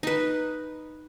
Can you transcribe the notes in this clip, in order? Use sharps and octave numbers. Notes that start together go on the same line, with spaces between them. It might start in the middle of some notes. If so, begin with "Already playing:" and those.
D#4 B4